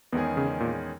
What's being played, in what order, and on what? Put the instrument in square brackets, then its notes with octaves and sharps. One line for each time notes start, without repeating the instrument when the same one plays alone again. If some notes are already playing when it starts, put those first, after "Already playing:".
[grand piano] E2 D#3 G#3 C#4 G#4 [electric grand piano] B3
[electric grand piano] C#3
A#2